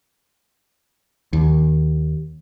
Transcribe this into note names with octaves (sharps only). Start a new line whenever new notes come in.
D#2